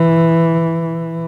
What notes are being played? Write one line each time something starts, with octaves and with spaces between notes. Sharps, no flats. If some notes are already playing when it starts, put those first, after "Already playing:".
Already playing: E3